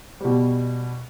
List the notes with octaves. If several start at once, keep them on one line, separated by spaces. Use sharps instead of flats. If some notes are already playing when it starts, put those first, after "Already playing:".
B2 G3